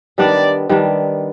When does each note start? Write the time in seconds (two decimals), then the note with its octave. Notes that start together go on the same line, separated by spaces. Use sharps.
0.18 D#3 G3 B3 D4 D5
0.69 D#3 G3 B3 D4